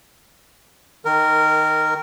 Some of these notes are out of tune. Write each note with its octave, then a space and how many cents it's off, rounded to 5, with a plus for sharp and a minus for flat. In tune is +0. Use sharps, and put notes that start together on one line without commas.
D#3 +0 A#4 -15